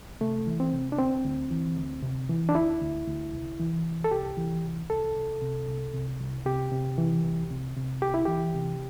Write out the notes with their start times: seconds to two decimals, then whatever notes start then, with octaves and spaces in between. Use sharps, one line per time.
0.21 C3 A3
0.47 E3
0.60 C4
0.73 C3
0.92 D4
0.99 D2 C4
1.25 D2
1.51 E3
1.77 D2
2.03 C3
2.29 E3
2.49 D4
2.55 D2 E4
2.81 D2
3.07 D2
3.33 C2
3.59 E3
3.85 C2
4.04 A4
4.11 C2 G4
4.37 E3
4.64 C2
4.90 C2 A4
5.15 C2
5.42 C3
5.67 C2
5.94 C3
6.20 C2
6.46 C3 G4
6.72 C3
6.98 E3
7.24 C2
7.50 C3
7.76 C3
8.02 C2 G4
8.14 E4
8.25 E3 G4
8.54 C3